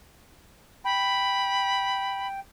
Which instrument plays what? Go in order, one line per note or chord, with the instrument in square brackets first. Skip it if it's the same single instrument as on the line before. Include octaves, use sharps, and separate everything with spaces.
[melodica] G5 [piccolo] B5